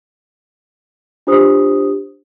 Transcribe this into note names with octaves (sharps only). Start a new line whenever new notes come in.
D4 F4 G4 C5 D#6